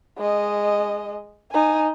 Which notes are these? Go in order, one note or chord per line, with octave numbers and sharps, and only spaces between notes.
G#3 D#5
D#4 G#5